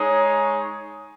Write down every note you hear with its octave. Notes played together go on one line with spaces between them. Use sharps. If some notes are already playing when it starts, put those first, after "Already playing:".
Already playing: G#3 D#4 G#4 C#5